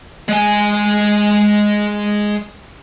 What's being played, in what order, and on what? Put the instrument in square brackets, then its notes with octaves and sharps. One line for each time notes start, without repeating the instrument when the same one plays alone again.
[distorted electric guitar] G#3 G#5